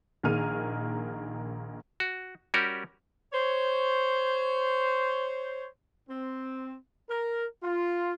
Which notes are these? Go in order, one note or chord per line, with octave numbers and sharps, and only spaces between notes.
A#1 D#3 A#3 G#4 F6 D#7
F#4
G3 C#4 F#4 G4 A#4
C5 C#5
C4
A#4
F4